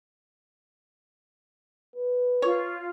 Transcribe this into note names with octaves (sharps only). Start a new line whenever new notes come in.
B4
F4 C#5